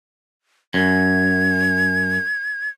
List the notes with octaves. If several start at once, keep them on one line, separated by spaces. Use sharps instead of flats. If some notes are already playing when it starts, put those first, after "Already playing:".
F#2 G#6